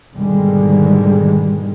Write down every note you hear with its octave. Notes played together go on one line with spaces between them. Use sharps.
G#2 B2 D3 D#3 G3 G#3